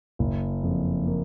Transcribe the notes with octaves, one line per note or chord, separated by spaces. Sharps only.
F#1
F2
A#3